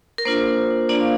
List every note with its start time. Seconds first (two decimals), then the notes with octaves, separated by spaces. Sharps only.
0.18 A#4
0.25 A#3 D4 F4 C5
0.89 A#3 D4 F4 D5
1.01 F5